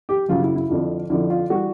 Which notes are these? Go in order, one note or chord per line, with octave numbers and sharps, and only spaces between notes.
G4
F#2 C#3 F#3 F4
E4
E4
F2 D3 F3
F2 D3 F3 E4
F4
E3 G3 F#4